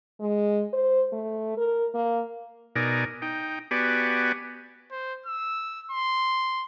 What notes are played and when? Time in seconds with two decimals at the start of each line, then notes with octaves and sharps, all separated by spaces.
0.21 G#3
0.73 C5
1.12 A3
1.57 A#4
1.95 A#3
2.76 B2 D#4 A#4 D5 G#5
3.22 D#4 G5
3.71 B3 F#4 G4 D5 G#5
4.92 C5
5.26 E6
5.91 C6